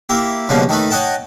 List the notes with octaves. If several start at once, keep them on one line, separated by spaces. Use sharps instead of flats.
A#3 E4 G4
C#2 G2 B2 F3 A#3 C#4
D#3 A3 D#4 B4
C#5 D#5 F#5 G5 A5